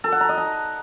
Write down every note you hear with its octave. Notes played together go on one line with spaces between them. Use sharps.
A4
F#5
A#5
D#5
A#5